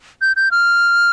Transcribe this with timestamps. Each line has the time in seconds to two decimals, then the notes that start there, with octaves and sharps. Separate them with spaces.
0.22 G6
0.36 G6
0.51 F6